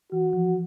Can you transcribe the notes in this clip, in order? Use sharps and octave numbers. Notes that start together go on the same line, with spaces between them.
E3 F#4
F3